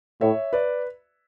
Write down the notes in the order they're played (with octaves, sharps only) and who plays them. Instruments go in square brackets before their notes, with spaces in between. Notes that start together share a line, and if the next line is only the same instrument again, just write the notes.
[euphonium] A2 [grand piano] C#5 E5
[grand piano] B4 D5